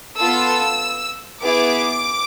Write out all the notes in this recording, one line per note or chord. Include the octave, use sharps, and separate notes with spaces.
B3 F4 A4 E6
B3 E4 G#4 D6